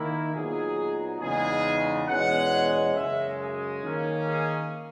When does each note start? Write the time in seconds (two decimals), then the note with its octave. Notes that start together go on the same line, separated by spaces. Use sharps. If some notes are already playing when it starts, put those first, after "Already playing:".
Already playing: D#3 A#3 E4
0.35 A#2 F#3 B3 D#4 G#4
1.21 E2 C#3 G#3 B3 D#4 G#4
2.08 E2 B2 G#3 C#4 F#5
2.95 F#2 C#3 G#3 E5
3.39 G#4
3.83 D#3 A#3 C#4
4.26 G#4